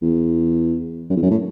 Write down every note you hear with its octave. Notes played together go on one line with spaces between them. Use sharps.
E2
F#2
E2
F#2
A2